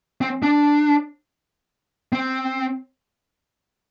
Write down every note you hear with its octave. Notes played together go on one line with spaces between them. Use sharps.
C4
D4
C4